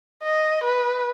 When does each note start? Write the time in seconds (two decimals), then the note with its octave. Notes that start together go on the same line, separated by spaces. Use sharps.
0.23 D#5
0.64 B4